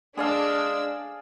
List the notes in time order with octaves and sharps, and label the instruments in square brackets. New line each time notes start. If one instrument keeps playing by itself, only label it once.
[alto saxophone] G#3 [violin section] D4 E6 [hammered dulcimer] G#4 D5 F5